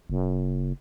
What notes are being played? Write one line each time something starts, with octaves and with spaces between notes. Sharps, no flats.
F#1